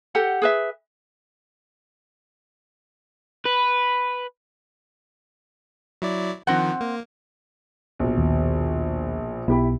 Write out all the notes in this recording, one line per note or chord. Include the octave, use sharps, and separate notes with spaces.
G4 A4 F#5
G#4 B4 E5
B4
F#3 E4 D5
D#3 F3 C4 F#5
A#3
A#1 B2
D#2
B1 B3 E4 G4 B5